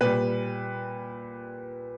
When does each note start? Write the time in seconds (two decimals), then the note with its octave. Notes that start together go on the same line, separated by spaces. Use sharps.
0.01 A#2 G3 B4